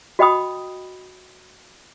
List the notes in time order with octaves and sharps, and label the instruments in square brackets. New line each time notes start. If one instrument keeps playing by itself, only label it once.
[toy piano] F#4 D#5 G5 B5 D#6